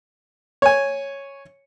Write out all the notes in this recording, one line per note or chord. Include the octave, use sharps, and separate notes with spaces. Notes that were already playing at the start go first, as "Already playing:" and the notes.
C#5 G#5